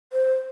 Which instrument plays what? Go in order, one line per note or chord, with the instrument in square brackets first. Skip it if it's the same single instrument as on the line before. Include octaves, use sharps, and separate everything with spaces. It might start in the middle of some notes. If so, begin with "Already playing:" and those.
[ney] C5